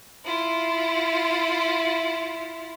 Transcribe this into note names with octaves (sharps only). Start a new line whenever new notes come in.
E4 F4